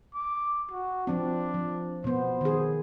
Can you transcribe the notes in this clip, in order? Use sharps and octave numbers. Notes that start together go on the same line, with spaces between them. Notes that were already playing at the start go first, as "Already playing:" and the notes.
D6
F#4
F3 C4 D4
F3
B2 B3 C5
D#3 G#4